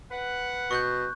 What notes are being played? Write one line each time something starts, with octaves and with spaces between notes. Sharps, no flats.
B4 F#5
B2 C#6 F#6 G6